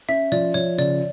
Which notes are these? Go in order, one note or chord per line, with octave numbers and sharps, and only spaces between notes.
C#4 E5
F3 D5
F3 C#5
C#3 D5